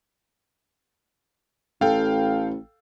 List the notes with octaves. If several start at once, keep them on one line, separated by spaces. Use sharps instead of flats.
A1 A4 F5 G5